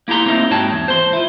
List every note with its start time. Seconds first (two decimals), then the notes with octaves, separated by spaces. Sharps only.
0.08 A#3 E4 G4 A#5 C6
0.26 A#3 C4 D#4 E4
0.51 G#2 F#4 C#5 G5 A5
0.73 E2
0.88 C5 C6
1.13 E4 F4